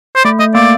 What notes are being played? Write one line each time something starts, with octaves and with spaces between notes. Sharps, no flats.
C5
A3 D5
A3 D#5
A#3 D5